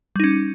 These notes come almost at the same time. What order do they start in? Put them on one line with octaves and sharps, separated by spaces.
G3 D#4 C#4